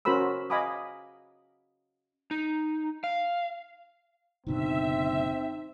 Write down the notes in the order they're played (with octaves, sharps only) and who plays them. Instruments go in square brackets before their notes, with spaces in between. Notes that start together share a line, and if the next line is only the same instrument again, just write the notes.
[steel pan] C#4 F#4 A#4 C5 B5 E6
D#5 F5 G#5 B5 D6 D#6
[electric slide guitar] D#4
F5
[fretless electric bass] F#1 B2 D3 [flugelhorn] C4 [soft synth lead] D#4 [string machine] E5